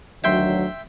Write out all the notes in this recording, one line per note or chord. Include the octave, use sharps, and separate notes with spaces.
D2 D#3 F#3 E5 G5 C6